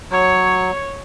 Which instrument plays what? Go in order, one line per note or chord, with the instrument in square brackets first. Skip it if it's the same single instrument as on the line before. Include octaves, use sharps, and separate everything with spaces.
[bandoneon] F#3 [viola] C#5